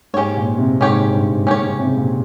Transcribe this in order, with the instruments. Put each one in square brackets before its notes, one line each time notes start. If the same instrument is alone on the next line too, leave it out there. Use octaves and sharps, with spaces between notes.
[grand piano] G#2 [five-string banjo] C#4 G4 C#5
[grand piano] A#2
C3
[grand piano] G#2 [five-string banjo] C#4 G4 C#5
[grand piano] G2
[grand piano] G#2 [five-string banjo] C#4 G4 C#5
[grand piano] C#3
C3
A#2